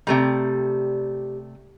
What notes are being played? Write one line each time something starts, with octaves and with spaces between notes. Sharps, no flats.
C3 G3 A3 A#5